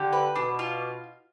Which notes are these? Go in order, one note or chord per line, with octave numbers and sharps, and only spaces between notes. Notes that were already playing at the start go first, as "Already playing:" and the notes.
Already playing: D3 G4
B4
B2 D4
F4